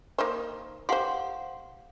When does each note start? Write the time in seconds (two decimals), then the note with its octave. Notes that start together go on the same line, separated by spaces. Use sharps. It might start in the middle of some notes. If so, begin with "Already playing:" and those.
0.18 A#3 D#4 C5
0.89 G4 C5 F5 F#5 C6